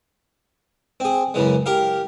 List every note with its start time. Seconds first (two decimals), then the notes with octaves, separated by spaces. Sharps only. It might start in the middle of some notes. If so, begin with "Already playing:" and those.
1.00 C4 G#4
1.34 F#2 C#3 E3 G#3
1.66 G4 A#4 F5